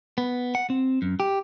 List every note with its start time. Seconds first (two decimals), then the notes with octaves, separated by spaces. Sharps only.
0.18 B3
0.55 F#5
0.70 C4
1.02 F#2
1.20 G4